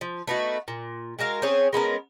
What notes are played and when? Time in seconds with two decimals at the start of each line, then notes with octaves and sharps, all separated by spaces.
0.01 F3
0.27 A3 B3 D#4 F#4
0.68 A#2
1.19 G#3 F#4 A#4 F5
1.42 C4 C#4 G#4 C#5
1.73 G#3 B3 C#4 A#4